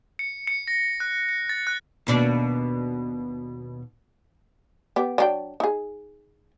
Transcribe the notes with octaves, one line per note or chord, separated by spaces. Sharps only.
C#7
C#7
A#6
F#6
C#7
A6
F#6
D#2 B2 D4
B3 G4
F#3 D4 G5
D#4 G#4